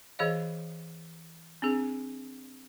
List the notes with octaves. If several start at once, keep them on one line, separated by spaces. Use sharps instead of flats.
E3 G#4 C#5 D#5 F5
C4 D4 G#4